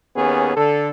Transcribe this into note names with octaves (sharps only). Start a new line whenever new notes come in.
D#2 B3 C#4 G#4
D3 A4